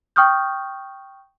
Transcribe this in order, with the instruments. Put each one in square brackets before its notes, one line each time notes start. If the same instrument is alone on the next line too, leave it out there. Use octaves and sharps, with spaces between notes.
[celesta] G5 C#6 D#6 F6 G6